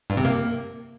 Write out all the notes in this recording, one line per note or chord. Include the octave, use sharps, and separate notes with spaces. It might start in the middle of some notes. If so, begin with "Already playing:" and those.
G2
C3
A#3